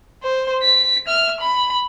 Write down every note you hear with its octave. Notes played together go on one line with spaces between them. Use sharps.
C5
B6
E5 F6
B5